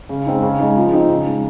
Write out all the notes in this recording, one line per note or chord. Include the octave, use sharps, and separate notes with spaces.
C#3
G#3 C4 D#4
C#3
G#3 D#4
F3
C4 D#4
C#3
G#3 D#4